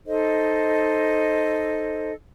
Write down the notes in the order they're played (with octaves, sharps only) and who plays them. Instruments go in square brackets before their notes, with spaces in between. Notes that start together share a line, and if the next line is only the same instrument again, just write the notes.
[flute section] D#4 A4 C5 D#5